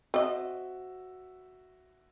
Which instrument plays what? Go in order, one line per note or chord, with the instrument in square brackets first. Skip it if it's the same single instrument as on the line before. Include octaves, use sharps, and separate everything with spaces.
[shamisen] C4 D#5 [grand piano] F#4 E5